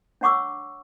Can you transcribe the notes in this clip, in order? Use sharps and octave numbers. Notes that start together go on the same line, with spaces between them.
D4 C#5 F#5 C#6 D6 E6